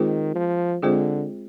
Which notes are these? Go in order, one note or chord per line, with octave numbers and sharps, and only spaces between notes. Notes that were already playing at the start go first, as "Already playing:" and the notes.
Already playing: D#3 G#3 C4 F4 G#4 C5
F3
D3 G#3 C4 F4 G#4 C5